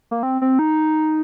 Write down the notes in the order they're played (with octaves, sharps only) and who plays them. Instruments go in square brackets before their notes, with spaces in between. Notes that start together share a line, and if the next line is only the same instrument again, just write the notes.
[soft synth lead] A#3
C4
C4
D#4